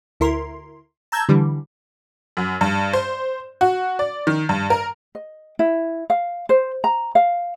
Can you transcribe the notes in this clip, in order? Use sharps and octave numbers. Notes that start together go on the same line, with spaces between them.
D2 E4 A#4 C6
A5 A#5 E6 G6 G#6
D3 E3 G3
F#2
G2
C5
F#4
D5
D#3
G2
A#4
D#5
E4
F5
C5
A#5
F5